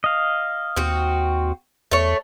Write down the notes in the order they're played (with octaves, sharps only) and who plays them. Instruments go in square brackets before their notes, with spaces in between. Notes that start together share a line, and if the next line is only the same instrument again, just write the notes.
[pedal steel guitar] D#5 F5
[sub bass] D#2 [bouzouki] C4 F#4
[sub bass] E2 [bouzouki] A3 C#5